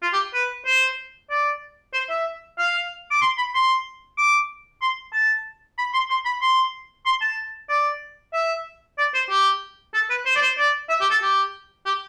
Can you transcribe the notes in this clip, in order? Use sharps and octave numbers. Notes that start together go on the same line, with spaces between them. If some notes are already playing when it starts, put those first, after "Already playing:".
F4
G4
B4
C5
D5
C5
E5
F5
D6
C6
B5
C6
D6
C6
A5
B5
C6
C6
B5
C6
C6
A5
D5
E5
D5
C5
G4
A4
B4
C5
D5
C5
D5
E5
G4
A4
G4
G4